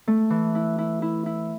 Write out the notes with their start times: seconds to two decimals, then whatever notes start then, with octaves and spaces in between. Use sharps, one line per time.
0.07 A3
0.30 E3
0.55 E4
0.78 E4
1.02 E4
1.26 E4